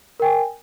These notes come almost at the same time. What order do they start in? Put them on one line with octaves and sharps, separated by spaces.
A#4 G5 G#5